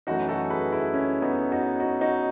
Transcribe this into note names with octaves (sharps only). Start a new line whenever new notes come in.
F#2 E3 A3 D#4 F#4
F#4 A4
G#4 B4
E4 G#4
C#4
B3 D#4
D#4 F#4
D#4 F#4
D#4 F#4